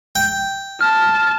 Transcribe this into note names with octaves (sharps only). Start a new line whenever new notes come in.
G5
A5 F6